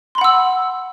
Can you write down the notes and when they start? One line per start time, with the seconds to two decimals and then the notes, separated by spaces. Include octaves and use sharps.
0.15 C6
0.18 B5
0.21 F#5
0.24 E6